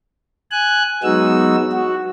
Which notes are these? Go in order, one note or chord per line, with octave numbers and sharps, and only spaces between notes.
G#5 F#6
F#3 G#3 B3 D#4 F#4 E6
F#4